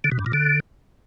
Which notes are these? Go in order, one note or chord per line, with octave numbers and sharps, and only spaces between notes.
D3
B2
G2
A#2
D3